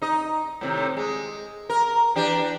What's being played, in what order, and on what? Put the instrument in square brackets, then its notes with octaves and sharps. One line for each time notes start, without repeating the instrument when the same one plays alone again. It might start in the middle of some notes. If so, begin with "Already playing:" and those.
[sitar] D#4 D#5
A2 C3 D#3
G#3
A#4
E3 D4 G4